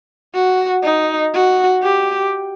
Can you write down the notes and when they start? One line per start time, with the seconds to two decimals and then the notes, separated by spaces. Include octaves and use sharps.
0.34 F#4
0.83 D#4
1.34 F#4
1.83 G4